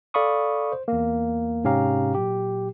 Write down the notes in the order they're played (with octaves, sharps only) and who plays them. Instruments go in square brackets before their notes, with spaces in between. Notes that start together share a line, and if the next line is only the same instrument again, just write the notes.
[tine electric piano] A4 D5 F5 B5 C#6 D#6
C5
E2 A#3
G#2 C3 C#4 G4 F5 A#5
A#2 F#3 G4